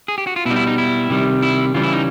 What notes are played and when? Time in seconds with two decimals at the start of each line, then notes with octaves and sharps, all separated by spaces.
0.08 G#4
0.18 G4
0.27 F#4
0.36 F4
0.45 B2 E4
0.50 G3 D#4
0.56 E4
0.67 D#4
0.78 E4
1.10 C3 D#3 G3
1.42 E4
1.74 C#3 E3 G3 F4
1.83 E4
1.93 D#4